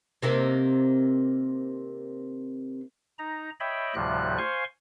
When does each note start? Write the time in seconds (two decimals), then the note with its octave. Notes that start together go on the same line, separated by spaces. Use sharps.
0.23 C3 D#3 A#3
3.19 D#4 A#5
3.60 C#5 D#5 E5 G5 B5
3.95 D2 A2 C3 F3 G3 F#6
4.38 C5 F5 G#5 C6 C#6